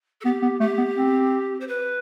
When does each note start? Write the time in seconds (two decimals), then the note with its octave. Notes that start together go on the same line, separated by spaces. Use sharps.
0.21 A4
0.24 B3 G4
0.42 B3
0.60 A3 G4
0.78 B3
0.96 C4
1.60 C5
1.67 B4